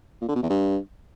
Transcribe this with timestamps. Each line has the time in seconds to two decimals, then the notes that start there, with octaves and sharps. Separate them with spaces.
0.21 A#2
0.28 D3
0.35 B2
0.43 E2
0.50 G2